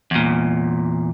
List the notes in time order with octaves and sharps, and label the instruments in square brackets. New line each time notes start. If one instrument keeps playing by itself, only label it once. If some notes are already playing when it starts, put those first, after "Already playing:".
[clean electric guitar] E2 A#2